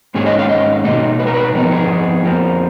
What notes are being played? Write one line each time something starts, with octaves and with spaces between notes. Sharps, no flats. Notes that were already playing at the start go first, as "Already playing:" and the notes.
G#2 D#3 A#3 C#4 G#4
D#5
F5
D#5
B2 A#3 D#4 D#5
B4
A#4
B4
F2 F3 B3 D#4 A#4
G#4
F2 F3 A#3